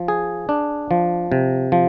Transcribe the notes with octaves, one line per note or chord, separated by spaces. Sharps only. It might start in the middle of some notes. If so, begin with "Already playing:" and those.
Already playing: F3
G#4
D4
F3
C3
F3